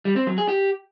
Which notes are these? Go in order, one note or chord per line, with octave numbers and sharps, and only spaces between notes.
G3
C4
F#3
G#4
G4